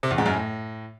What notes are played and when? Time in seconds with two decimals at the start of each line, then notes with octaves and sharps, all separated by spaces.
0.03 C3
0.11 E2
0.18 G#2
0.26 F#2
0.33 A2